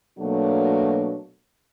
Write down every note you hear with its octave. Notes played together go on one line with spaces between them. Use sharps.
B2 F#3 A3 A#3 D4